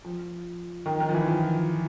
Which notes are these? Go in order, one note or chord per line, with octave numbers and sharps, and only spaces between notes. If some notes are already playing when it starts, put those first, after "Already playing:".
F3
D#3
D#3
F3
E3
F3